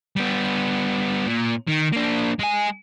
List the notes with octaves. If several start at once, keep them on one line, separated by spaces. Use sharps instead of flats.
G3 B3
A#2
D#3
A#3 D4
G#3 G#5